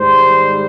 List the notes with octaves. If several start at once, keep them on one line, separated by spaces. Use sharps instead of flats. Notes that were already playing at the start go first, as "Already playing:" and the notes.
Already playing: G#2 D#3 G3 C5